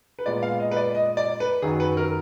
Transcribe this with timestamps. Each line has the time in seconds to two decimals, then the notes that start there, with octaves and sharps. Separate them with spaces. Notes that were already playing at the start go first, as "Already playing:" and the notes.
0.19 B4
0.26 A#2 G#3 B3 D5
0.43 F5
0.60 D#5
0.71 B4
0.77 D5
0.95 D#5
1.17 D5
1.40 B4
1.62 F#2 D#3 F#3 G#4
1.80 B4
1.97 A#4